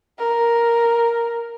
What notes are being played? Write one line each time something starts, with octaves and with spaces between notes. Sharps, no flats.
A#4